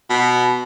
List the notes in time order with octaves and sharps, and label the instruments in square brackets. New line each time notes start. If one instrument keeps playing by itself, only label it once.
[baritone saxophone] B2